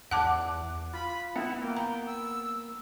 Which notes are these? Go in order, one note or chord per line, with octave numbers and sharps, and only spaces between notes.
E2 F#5 A5 D6 F#6
F4 B5
B3 E4
A#3 G5
G5 A#5
E6